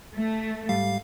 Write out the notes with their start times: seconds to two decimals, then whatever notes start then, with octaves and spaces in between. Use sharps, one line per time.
0.15 A3
0.69 G#2 G3 F5